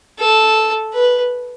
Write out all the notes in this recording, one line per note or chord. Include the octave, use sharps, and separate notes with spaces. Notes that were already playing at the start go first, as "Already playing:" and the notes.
A4
B4